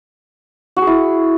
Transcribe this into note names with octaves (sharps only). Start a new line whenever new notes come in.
F#4
G#4
E4